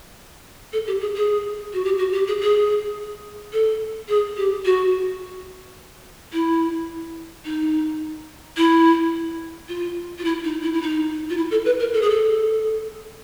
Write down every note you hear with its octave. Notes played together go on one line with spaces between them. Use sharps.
A4
G4
G#4
G#4
F#4
G4
F#4
G4
G#4
G#4
A4
G#4
G4
F#4
E4
D#4
E4
F4
F4
E4
D#4
E4
E4
D#4
F4
E4
A4
B4
A#4
A4
G#4
A4